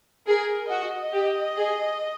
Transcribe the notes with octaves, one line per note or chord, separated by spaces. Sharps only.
G#4 A#4
F#4 D#5
G4
G#4